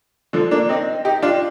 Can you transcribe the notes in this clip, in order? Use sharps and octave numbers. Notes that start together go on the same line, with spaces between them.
D3 F3
A#3 D4
C4 D#4
D#4 G4
D4 F4